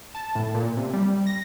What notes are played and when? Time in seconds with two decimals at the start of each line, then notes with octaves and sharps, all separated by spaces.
0.15 A5
0.35 A2
0.54 A#2
0.77 C3
0.93 G3
1.27 A#6